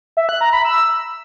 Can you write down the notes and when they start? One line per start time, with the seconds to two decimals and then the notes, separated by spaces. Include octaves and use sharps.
0.17 E5
0.29 F#6
0.41 A#5
0.53 B5
0.65 E6